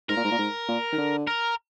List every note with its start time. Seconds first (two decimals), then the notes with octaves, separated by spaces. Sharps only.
0.09 G#2 A#4
0.17 A#2
0.24 G#2
0.31 A#2
0.39 G#2
0.68 A#2
0.92 D#3
0.98 D3
1.27 A#4